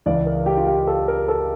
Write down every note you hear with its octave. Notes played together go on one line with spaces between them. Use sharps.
C#2 C#3 E3 D5
A#4
G4
F4
G4
A4
A#4
A4